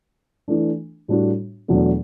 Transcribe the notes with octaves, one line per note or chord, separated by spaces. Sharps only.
E3 A3 D4
A2 G3 D4 F#4
E2 B2 F#3 A3 D4